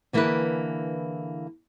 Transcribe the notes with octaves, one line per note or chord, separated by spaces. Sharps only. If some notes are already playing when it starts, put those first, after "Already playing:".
D3 E3 A#3 E4 G#4 B4